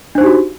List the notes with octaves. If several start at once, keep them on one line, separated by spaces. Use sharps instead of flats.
D4 D#4 F#4 G4 C5